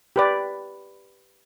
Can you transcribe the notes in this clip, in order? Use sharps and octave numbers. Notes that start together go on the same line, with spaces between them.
G4 B4 D5